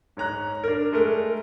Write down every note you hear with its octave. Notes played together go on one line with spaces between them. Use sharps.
G#2 C#5 A#5 F#6
D4 A#4
G#3 A3 A#4